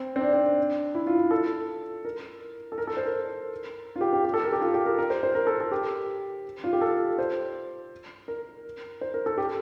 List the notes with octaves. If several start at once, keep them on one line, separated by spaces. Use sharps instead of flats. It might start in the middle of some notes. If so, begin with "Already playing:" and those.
Already playing: C4
C4
D4
C4
D4
E4
F4
A4
A#4
A4
A#4
A4
C5
A#4
F4
G4
G4
G4
A4
A#4
G4
F4
G4
A#4
A#4
C5
C5
A#4
A4
A4
G4
F4
G4
A4
C5
A#4
C5
A#4
A4
G4